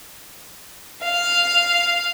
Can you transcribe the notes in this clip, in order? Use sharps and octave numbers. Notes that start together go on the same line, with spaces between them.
F5